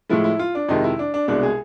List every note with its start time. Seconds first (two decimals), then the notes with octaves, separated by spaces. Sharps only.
0.09 A2 F3 G#3 E4
0.24 E4
0.39 F4
0.55 D4
0.69 F2 C3 D#3 G#3 D#4
0.84 E4
0.99 D4
1.14 D4
1.28 C2 B2 G#3 D4
1.43 G#4